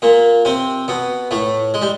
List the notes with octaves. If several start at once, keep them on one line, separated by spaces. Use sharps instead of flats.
A#2 A#3
C3 C4
B2 B3
A2 A3
G#3
G3